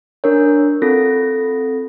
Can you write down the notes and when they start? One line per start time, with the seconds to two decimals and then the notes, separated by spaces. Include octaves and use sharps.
0.24 D4 A#4 C#5
0.82 C4 F4 A4 A#6